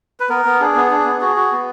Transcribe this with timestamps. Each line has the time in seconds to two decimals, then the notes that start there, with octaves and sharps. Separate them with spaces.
0.20 B4
0.29 B3 A#4
0.45 B3
0.60 D4 G#4
0.76 B3
0.91 D4 G#4
1.05 B3
1.21 F#4 G#4
1.36 F#4
1.52 B3